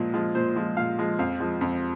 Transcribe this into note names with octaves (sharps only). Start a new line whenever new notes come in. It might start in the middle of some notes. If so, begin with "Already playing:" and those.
Already playing: A#2 F3 G#3
F3 G#3
A#2 C5
F3 G#3
A#2 F5
F3 G#3
F2 F5
F3 G#3
F2